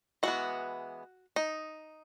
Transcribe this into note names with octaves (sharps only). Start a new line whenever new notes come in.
E3 G#3 B3 F#4
D#4